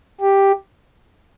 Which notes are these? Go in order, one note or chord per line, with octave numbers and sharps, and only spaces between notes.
G4